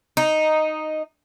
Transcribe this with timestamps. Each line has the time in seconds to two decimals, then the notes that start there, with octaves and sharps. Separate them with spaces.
0.17 D#4